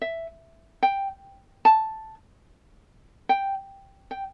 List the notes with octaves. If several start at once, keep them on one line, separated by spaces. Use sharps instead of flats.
E5
G5
A5
G5
G5